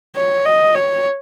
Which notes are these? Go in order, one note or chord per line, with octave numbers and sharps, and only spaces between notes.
C#5
D#5
C#5